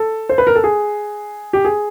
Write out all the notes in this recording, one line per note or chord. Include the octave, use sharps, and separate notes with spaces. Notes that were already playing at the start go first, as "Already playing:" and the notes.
Already playing: A4
C5
B4
A#4
A4
G#4
G4
G#4